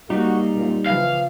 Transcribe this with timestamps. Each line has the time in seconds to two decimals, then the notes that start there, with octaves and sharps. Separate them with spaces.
0.10 G3 A#3 D#4 F#4
0.56 F#2 A#2
0.86 C#3 E3 F3 F5